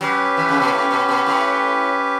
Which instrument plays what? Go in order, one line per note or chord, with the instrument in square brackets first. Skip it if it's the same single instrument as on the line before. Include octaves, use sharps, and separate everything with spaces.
[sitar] F#3 [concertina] C#4 G4 B4
[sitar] E3
C#3
B2
A2
B2
B2
A2